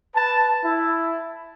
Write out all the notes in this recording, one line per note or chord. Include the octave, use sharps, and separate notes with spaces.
B4 A5
E4